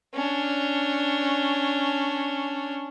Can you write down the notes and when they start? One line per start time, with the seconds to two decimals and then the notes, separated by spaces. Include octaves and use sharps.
0.14 C#4 D4